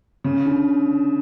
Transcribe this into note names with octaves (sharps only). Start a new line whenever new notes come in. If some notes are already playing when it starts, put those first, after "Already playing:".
C#3
D3